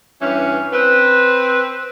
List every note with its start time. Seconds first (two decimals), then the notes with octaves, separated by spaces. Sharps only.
0.21 G2 E3 C#4
0.73 C4 B4